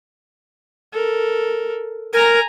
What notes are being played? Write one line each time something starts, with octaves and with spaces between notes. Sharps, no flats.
A4 A#4
A#4 G#5 A#5